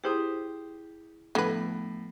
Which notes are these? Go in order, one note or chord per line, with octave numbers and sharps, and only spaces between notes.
E4 G4 G#4 C5 D#6
A2 D3 F3 A3 B3 B4